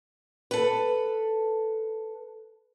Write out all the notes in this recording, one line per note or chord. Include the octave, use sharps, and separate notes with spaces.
A4 B4